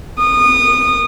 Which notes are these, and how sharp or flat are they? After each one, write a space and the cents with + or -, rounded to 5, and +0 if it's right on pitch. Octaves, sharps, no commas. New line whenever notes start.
D#6 -25